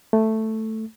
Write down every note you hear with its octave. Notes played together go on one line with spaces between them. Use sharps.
A3